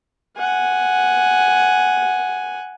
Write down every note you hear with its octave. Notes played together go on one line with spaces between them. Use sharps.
F#5 G#5